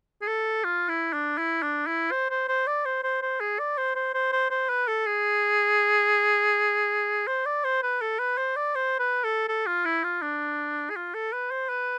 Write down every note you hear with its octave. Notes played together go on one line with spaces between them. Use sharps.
G#4
A4
F4
E4
D4
E4
D4
E4
C5
C5
C5
D5
C5
C5
C5
G#4
D5
C5
C5
C5
C5
C5
B4
A4
G#4
C5
D5
C5
B4
A4
B4
C5
D5
C5
B4
A4
A4
F4
E4
F4
D4
G#4
F4
A4
B4
C5
B4